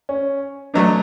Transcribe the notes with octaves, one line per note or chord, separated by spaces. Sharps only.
C#4
B2 F#3 A3 D4